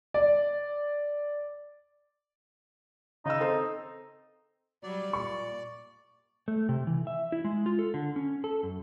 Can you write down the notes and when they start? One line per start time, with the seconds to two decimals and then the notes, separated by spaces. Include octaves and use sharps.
0.14 D5
3.25 C#3 D#4 E6
3.40 C4 A4 C5
4.83 F#3 G3 D5
5.13 A#2 C#6
6.48 A3
6.69 C3
6.87 E3
7.07 E5
7.32 E4
7.44 G#3
7.66 F4
7.79 A4
7.94 D3
8.16 C#4
8.44 A4
8.63 F#2